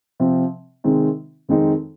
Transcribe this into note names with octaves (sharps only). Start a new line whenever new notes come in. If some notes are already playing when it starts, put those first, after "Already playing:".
C3 F3 C4
C3 D#3 G#3 C4 D#4
F2 D#3 G#3 C4 D#4